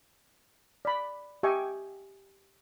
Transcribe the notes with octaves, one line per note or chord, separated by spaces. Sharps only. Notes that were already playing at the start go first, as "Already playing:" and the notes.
D5 B5
G4 D#5 E5 G5 G#5 C#6